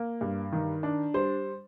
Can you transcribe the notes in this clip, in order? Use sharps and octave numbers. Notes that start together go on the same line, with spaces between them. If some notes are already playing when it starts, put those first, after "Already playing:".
Already playing: A#3
G2
D#3
D4
G3 C5